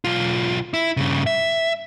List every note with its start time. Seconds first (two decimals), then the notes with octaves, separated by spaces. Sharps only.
0.05 B1 F4
0.74 E4
0.97 G2 C#3
1.27 E5